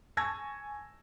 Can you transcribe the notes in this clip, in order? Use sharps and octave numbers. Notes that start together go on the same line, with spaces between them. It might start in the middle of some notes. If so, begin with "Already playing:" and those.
G#5 A5 C#6 E6 G#6 A#6